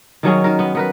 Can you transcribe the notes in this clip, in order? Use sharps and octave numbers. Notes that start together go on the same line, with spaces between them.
D#3 F#3 C#4 G#4
D#3 A#4
B3
B3 A#4 B4